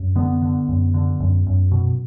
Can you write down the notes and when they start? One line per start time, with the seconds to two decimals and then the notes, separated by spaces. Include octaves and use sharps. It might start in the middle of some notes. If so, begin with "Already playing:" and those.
Already playing: F#2
0.16 D3 B3
0.42 D3
0.69 F#2
0.94 D3
1.20 F#2
1.47 F#2
1.72 B2